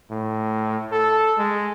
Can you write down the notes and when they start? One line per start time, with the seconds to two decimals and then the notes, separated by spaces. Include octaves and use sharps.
0.11 A2
0.92 A4
1.38 G#3